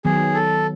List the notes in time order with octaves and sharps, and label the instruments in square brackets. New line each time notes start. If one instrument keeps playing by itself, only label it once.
[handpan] D#3 F#3 B3 [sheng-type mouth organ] G#4
[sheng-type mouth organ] A4